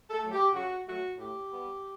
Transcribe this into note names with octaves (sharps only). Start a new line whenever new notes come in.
A4
F#3 A3
G4
C#3 F#4
F#3 A3 F#4
A2 G4
G3 B3